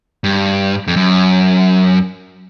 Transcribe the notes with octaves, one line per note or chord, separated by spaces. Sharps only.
G2
F2
F#2